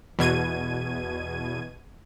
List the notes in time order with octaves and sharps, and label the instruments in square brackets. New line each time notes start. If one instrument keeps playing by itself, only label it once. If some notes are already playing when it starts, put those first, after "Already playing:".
[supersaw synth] E2 B2 G#6 D#7